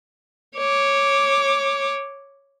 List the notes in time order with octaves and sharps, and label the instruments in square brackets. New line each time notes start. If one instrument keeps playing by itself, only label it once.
[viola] C#5 D6